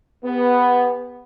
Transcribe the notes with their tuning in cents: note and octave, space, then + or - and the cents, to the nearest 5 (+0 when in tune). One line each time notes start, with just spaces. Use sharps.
B3 +0 G4 +45